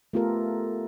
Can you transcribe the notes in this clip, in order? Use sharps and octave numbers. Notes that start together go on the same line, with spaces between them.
A3 B3 F4 G4 A4 A#4